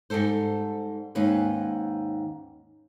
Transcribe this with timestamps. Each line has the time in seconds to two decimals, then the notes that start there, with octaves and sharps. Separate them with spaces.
0.10 G#2 C#3 G3 A4 C5
1.15 D#2 G#2 C#4 B4